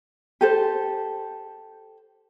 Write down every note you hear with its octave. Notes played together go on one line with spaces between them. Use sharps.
G4 A4 C5